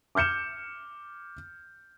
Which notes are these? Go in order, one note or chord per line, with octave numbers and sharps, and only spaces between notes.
D6 F6 G6 C#7 E7